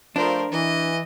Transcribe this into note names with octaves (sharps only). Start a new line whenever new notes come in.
F3 A3 D4 A#4 C5
E3 D#5